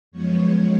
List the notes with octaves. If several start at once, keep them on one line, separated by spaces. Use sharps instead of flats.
F#2 F3 G#3 B3 C#5